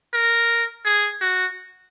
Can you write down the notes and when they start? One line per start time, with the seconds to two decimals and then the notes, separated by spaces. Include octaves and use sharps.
0.14 A#4
0.85 G#4
1.21 F#4